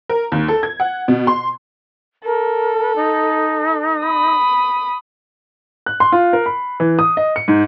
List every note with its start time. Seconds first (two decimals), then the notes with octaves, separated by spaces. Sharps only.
0.09 A#4
0.32 D#2
0.48 A4
0.63 G#6
0.80 F#5
1.08 B2
1.27 C6
2.25 A4 A#4
2.96 D#4
4.02 B5 D#6
5.86 F#6
6.00 C6
6.12 F4
6.33 A#4
6.46 B5
6.80 E3
6.99 D#6
7.17 D#5
7.36 C#7
7.48 G#2